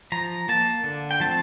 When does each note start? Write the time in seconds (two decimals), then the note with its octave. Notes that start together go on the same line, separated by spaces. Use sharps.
0.12 F3 A#5
0.49 A#3 A5
0.84 D3
1.11 G5
1.20 F3 A3 C4 A5